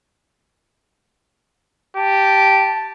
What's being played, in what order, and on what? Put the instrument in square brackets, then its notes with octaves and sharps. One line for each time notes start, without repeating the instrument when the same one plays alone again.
[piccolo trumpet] G4 [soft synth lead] A5